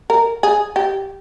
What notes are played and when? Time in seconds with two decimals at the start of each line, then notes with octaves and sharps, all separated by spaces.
0.10 A#4
0.43 G#4
0.76 G4